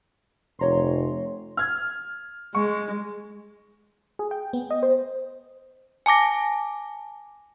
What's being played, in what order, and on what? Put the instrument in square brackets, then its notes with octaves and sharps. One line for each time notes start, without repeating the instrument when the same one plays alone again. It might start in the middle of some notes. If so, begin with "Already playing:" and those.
[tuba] F1 [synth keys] C#5 A#5 C6
[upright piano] F6 G#6
[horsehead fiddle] G#3 [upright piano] C#6
[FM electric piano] G#4
G5
B3
D#5
C5
[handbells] G#5 A5 D6 A#6